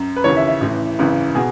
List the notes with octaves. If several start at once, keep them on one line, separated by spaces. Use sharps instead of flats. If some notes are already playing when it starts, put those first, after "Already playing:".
Already playing: F#2
B4
D#2 C#3 E3 C#5
E5
E5
A1 A2 E3
G#1 F#2 C#3 E3
B2 G#4